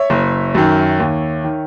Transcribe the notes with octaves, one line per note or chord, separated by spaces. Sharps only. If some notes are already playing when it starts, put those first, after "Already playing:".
Already playing: C#5 E5
F#1
F#2 D#3
D#2
D#3